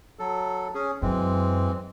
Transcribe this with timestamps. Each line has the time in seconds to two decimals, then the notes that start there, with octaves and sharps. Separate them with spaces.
0.19 F#3 A4
0.74 C#4 G#4
1.02 F#2 E3 G#3 C4